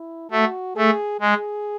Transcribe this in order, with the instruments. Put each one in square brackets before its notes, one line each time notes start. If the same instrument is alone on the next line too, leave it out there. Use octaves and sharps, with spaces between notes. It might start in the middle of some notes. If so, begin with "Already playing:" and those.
Already playing: [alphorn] E4
[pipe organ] A3 [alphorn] F#4
[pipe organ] A3 [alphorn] G#4
[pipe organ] G#3 [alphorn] G#4